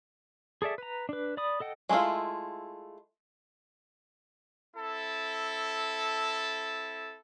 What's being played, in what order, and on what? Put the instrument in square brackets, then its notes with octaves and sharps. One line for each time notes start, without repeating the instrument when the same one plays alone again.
[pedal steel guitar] G#4 A4 D5 E5
B4 A#5
D4 B4
D5 B5 D#6
A4 D#5 F#5 G5
[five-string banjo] G#3 A3 D4 E4 F4
[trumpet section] C4 E4 A4